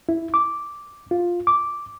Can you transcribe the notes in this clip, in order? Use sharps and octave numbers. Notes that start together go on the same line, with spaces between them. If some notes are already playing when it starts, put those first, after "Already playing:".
E4
D6
F4
D6